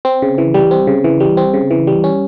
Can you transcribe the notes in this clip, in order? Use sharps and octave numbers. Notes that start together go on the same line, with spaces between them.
C4
C#3
E3
G3
C4
C#3
E3
G3
C4
C#3
E3
G3
C#4